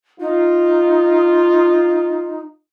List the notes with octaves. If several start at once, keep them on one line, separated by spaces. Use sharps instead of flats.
D#4 F4